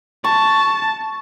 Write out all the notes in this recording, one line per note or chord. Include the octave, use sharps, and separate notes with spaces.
A5 C#6